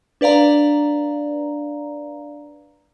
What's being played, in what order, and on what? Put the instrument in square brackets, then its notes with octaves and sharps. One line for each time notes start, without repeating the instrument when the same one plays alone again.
[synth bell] D4 B4 D5 F5 A#5